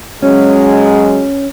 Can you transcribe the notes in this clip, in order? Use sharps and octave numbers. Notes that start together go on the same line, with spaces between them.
F#3 G#3 C#4